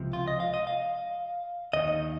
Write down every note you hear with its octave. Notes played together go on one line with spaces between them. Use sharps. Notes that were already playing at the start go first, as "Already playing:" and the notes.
Already playing: C#2 C3 F3
F4
D#5
F5
D#5
F5
D#2 D#3 D#5